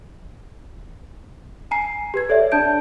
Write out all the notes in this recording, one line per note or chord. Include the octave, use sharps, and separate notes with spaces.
G#5 A#5 C7
G4 B4 G#6
A4 C#5 D5 E5
D4 A5 G6 D7